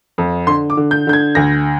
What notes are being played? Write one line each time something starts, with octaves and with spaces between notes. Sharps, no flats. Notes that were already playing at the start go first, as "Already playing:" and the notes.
F2
D3 C6
D6
D3
G6
D3 G6
G#6
D2 A#6